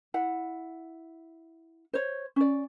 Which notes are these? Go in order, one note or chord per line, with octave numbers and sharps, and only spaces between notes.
E4 F#5
C5 C#5
C#4 D5